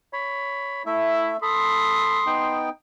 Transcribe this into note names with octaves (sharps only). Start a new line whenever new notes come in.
C#5 B5
A3 E4 E5
A4 B5 C6 D#6
B3 D#4 G5